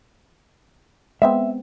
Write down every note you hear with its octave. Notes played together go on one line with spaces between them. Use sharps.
G#3 B3 C4 E5